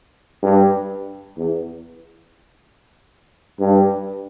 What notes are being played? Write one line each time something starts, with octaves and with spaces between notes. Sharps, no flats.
G2
E2
G2